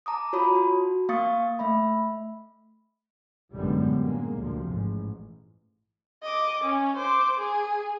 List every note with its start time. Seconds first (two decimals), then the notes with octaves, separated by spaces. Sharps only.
0.06 A5 A#5 D6 D#6
0.33 F4 F#4 C#5 A5 B5 D#6
0.55 F#4
1.09 A#3 F5 C#6 D#6 A6 C#7
1.59 A3 E5 B5
3.54 A1 F#2 D3 G3 G#3 B3
4.01 C#3 G#3 A#3
4.36 D2 C3 F3
4.64 A1 G#2
6.23 D#5 D6
6.63 C#4
6.96 C5 D6
7.38 G#4